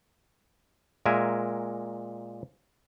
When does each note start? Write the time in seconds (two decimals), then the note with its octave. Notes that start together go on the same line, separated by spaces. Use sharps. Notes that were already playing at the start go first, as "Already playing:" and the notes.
1.06 A#2 G#3 A#4 E5 G#5